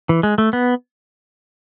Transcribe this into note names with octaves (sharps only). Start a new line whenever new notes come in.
E3
G#3
A3
B3